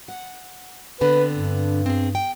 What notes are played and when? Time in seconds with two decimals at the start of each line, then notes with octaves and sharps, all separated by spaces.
0.08 F#5
1.01 D3 B3 C4 B4
1.33 G2
1.86 C4 G#4
2.15 G5